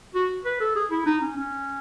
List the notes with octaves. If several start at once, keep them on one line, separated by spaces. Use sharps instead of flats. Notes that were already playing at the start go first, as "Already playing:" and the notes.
F#4
B4
A4
G#4
E4
D#4
C#4
C#4